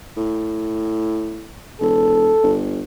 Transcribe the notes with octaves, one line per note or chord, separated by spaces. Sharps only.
A2
E1 A4
G1